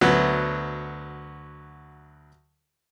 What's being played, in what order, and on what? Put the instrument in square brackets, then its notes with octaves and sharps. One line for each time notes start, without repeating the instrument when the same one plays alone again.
[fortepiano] D2 F#3 B3